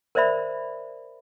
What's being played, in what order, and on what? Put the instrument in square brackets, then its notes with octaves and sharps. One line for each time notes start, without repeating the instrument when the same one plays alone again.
[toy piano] A#4 C5 D5 E5 B5